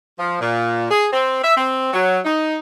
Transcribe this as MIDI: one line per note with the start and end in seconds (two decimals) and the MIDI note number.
0.19 0.35 53
0.41 0.86 46
0.91 1.07 68
1.13 1.40 60
1.44 1.57 76
1.57 1.93 60
1.93 2.19 54
2.25 2.57 63